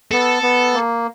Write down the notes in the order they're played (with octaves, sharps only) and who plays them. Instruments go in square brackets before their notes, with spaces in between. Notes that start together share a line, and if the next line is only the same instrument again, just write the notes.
[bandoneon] B3 [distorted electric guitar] A4
[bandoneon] B3
A#3